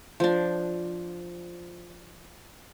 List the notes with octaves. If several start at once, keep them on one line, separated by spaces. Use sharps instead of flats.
F3 D4